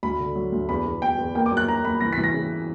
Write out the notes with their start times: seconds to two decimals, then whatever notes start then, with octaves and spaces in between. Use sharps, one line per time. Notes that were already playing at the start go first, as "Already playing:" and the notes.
0.03 D2 B5
0.19 D3
0.36 F#3
0.52 D2
0.69 E2 B5
0.85 E2
1.02 E2 G5
1.19 E2
1.35 A#3 G5
1.46 D6
1.51 F#2
1.57 F#6
1.68 A#3 A#5
1.84 A#3 B5
2.00 E3 A#6
2.13 B6
2.17 E3
2.24 A#6
2.34 C#3